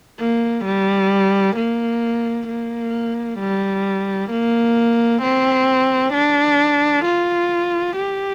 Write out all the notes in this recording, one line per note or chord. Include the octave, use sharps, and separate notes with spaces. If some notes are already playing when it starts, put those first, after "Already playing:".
A#3
G3
A#3
A#3
G3
A#3
C4
D4
F4
G4